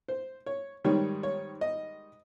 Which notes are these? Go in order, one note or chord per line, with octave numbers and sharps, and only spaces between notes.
C5
C#5
G#2 D#3 G3 C#5
C#5
D#5